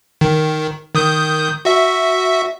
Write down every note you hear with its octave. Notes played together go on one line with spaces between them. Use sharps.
D#3
D#3 D#6 G6
F#4 E5